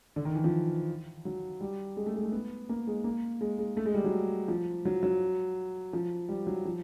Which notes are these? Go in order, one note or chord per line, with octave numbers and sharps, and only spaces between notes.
D3
D#3
E3
F3
F#3
G3
G#3
A3
G#3
A3
B3
A#3
G#3
A#3
G#3
G#3
A3
G#3
G3
F#3
F3
F#3
F#3
F3
G3
F#3
F3